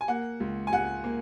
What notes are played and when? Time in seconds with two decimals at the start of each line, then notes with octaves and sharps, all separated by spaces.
0.01 G#5
0.08 A#3 F#5
0.40 C#2
0.67 G#5
0.72 C#2 F#5
1.04 A#3